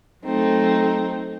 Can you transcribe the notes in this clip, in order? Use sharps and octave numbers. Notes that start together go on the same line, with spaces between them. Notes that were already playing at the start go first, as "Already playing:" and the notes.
F#3 A3 C4 D#4